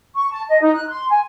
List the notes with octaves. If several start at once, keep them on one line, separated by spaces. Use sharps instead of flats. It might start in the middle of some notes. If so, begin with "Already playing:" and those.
C#6
A5
D#5
D#4
F#6
C6
G#5